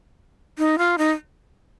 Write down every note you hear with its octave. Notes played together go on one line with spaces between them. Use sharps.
D#4
F4
D#4